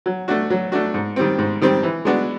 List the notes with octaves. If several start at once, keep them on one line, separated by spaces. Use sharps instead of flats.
F#3
A3 D4 F#4
F#3
A3 D4 F#4
G#2
D#3 G3 C4
G#2
D#3 G3 C4
E3
G#3 B3 D4 F#4